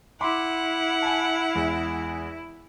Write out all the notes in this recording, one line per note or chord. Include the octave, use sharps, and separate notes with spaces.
E4 F#5 B5 C6 D6
G#5 A5
E2 G#3